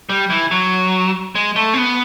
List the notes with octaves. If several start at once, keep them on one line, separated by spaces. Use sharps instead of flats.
G3
E3
F#3
G#3
A3
C4
B3